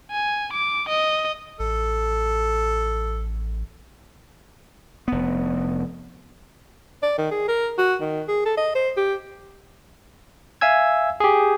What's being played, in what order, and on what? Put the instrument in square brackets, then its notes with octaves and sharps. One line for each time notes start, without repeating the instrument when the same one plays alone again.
[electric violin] G#5
D6
D#5
[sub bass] A1 [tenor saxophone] A4
[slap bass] F1 B3
[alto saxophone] D5
D#3
G#4
A#4
F#4
D#3
G#4
A4
D#5
C5
G4
[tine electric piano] E5 F5 G#5 E6 G#6
G4 G#4